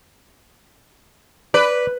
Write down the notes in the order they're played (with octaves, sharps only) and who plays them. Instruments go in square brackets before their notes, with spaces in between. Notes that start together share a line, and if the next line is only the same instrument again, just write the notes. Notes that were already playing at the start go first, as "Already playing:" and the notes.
[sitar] B4 [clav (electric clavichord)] D5